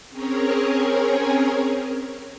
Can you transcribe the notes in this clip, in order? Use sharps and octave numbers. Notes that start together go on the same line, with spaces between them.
C4 C#4 G#4 A#4 C#5